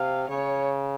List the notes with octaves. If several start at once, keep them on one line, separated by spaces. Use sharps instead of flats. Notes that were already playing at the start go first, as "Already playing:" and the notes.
Already playing: C3 F5
C#3 C#5